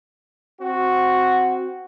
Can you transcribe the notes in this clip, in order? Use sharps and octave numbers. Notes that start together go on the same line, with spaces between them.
C4 F#4